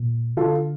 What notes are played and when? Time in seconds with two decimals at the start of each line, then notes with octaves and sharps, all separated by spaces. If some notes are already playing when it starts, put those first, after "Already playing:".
Already playing: A#2
0.37 D3 F4 A4